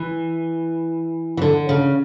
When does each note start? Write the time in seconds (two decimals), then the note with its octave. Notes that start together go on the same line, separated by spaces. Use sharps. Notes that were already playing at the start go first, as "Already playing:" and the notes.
Already playing: E3
1.37 E3
1.42 D3
1.69 C#3